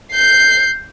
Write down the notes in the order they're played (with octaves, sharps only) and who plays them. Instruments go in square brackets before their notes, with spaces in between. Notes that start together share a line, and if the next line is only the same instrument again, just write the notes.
[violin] G6 C7